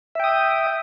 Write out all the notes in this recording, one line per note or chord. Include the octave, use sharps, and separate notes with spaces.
E5 G5 D#6